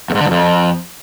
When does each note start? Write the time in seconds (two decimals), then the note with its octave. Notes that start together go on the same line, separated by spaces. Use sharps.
0.10 E2
0.15 G#2
0.20 D3
0.26 G2
0.31 F2